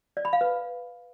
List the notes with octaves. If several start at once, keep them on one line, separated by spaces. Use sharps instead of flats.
D5
B5
F5
B4